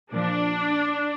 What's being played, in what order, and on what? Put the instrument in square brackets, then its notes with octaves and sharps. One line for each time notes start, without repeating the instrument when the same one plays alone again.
[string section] A#2 F3 D4